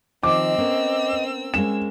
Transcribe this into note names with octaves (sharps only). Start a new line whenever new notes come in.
D#3 F3 C4 D#5 D6 E6
A#3 B3 C#4
G#3 A#3 C#4 E7